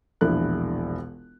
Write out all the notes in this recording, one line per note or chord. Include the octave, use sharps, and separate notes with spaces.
E1 A#1 D4 E4 F#6